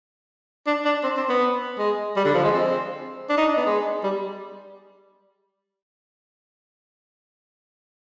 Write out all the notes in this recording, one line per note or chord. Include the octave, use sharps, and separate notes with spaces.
D4
D4
C4
C4
B3
G#3
G3
D3
F3
G#3
C4
D4
D#4
D4
B3
G#3
G3